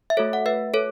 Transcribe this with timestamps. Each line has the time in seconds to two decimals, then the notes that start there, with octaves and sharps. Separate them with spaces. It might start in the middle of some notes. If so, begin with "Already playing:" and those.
0.10 E5
0.17 A3 F#4 A4 C#5
0.33 F#5
0.46 B4 E5
0.74 A4 C#5